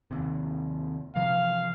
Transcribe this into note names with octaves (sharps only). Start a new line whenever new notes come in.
D#2 C3
C3 E3 F3 F5